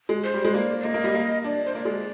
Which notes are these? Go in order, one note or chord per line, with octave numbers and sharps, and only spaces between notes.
G#3
C5
G3
G#3
A#3 D5
D5
A#3 D#5
A#3
G3
A#3
D4 D5
C5
A#3 D5
G#3